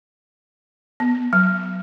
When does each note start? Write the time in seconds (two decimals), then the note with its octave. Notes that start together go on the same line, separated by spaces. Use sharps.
1.00 B3
1.33 F#3